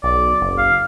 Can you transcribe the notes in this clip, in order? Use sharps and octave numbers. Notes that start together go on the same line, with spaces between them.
B1 D5
F#1
F5